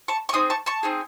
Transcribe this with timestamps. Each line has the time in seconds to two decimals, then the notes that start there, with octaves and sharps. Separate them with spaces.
0.08 A5 C#6
0.29 C#6
0.33 C4 D#4 G#4 C6 D#6
0.50 A5 C#6
0.66 A5 C#6
0.83 C4 D#4 G#4